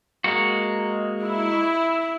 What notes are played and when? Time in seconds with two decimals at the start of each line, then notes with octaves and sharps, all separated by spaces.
0.24 G#3 A#3 F#4
1.23 E4